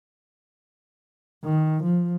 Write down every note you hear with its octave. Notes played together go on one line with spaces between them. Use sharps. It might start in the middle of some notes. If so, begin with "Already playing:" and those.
D#3
F3